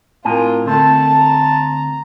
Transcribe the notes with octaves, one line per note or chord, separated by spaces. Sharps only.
A2 C4 F4 A#4 G#5
D2 A3 C4 A4 A5
A#5